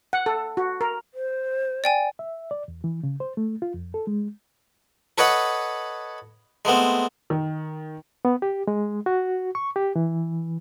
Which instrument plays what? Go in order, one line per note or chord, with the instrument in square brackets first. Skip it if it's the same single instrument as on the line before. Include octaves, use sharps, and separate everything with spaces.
[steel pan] F#5
A4
F#4
A#4
[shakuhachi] C5
[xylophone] D5 G5 G#5
[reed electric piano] E5
D5
E2
E3
C#3
C5
A3
F4
F2
A4
G#3
[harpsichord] A4 B4 C#5 D#5 F#5
G#3 A3 B3 C4
[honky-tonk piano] D#3
[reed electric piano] B3
G4
G#3
F#4
C#6
G4
E3